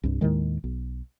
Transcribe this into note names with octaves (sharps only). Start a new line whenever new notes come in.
C2 G2
D#2 A2 D#3 G#3
B1